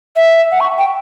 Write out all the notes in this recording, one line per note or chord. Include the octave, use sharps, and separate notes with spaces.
E5
F#5
C#6
G5